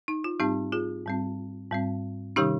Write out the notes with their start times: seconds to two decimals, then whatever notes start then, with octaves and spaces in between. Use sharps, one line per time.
0.08 D#4
0.24 F4
0.40 G#2 G3 C4 D#4 G4
0.72 F4 G#4
1.06 G#2 G3 C4
1.71 G#2 G3 C4
2.36 C3 D#3 G3 C#4 D#4 G4